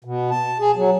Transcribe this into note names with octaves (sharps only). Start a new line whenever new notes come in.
B2
A5
G#4
F#3